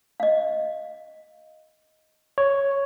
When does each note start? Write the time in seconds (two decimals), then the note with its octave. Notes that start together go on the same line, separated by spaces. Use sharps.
0.20 D#5 F5
2.38 C#5